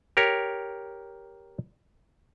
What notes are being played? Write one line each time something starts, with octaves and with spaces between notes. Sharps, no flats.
G4 A#4 C#5